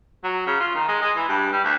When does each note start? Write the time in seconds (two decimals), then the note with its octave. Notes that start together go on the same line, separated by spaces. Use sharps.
0.24 F#3
0.47 C#3
0.60 F4
0.75 D#3
0.88 G#3
1.01 G#3
1.16 E3
1.28 G2
1.52 G3
1.64 D2